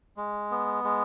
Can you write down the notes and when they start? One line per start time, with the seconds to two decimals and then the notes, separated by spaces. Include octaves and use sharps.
0.17 G#3
0.51 B3
0.84 G#3